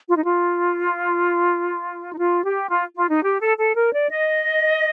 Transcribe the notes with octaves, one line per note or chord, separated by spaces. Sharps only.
F4
D#4
F4
D#4
F4
G4
F4
F4
D#4
G4
A4
A4
A#4
D5
D#5